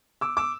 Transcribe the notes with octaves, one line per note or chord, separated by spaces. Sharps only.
D6 E6
D6 E6